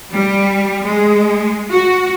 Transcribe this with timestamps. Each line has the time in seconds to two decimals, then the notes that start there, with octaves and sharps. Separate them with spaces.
0.13 G3
0.86 G#3
1.72 F#4